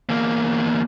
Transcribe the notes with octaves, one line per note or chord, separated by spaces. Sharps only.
E2 A#3